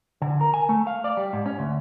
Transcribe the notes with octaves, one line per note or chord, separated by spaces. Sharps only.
D3
A#4
G#5
A3
F5
D5
G3
G#2
C#4
D2